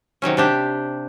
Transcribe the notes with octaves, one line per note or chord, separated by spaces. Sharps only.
C3 D#3 F#3 C#4
C3 D4 G4